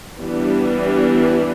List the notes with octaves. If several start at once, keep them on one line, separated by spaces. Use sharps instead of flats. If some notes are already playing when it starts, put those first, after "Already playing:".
E3 G3 B3 D4